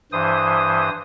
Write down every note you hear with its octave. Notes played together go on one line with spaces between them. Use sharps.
G2 E3 C5 D#6